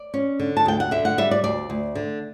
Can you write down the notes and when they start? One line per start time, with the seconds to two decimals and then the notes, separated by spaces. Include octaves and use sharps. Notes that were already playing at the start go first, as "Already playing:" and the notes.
Already playing: D5
0.14 C#4
0.40 D3
0.57 A5
0.66 D2 G5
0.80 F#5
0.91 D3 E5
1.05 F#5
1.18 G3 E5
1.31 D5
1.44 D2 D5
1.70 D2
1.95 D3